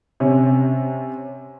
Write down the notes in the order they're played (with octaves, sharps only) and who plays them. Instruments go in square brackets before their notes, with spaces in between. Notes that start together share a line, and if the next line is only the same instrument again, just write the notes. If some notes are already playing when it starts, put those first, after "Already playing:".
[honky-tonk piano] C3 C#4